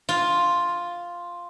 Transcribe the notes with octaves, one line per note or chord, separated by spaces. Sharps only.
F4